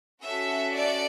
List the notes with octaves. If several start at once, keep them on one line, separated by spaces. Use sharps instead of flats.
C#4 F#4 A4 E5
D5